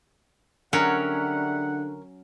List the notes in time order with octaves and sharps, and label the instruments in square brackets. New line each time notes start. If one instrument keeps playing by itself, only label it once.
[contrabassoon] D3 [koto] F#3 C#4 [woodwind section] G3 E5 F#5 [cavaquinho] A#4